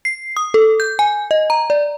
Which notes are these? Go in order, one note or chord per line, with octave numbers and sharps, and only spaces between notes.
C7
D#6
A4
G6
G#5
D#5
A#5
D5